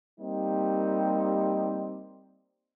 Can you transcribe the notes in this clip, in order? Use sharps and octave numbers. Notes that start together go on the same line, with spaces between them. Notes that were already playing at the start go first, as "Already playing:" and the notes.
G3 A#3 C4 D#4 G4